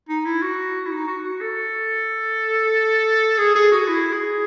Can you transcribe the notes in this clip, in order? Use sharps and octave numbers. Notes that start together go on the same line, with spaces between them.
D#4
E4
F#4
E4
D#4
F#4
F#4
A4
G#4
G#4
F#4
E4
G#4